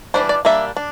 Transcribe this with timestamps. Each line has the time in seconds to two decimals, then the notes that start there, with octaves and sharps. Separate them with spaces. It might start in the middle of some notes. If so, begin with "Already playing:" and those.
0.14 E3 G3 A#3 D4 C5
0.29 D5
0.45 G3 A#3 D4 E5
0.77 D4